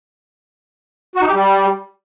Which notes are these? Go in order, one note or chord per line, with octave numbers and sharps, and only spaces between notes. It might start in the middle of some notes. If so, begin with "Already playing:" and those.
F#4
D#4
G4
G3